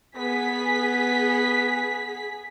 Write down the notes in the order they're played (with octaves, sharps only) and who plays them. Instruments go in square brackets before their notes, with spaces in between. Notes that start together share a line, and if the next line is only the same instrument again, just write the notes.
[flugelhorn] B3 [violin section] G#4 B6